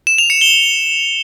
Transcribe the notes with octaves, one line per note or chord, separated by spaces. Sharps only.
E7
F7
C#7
G7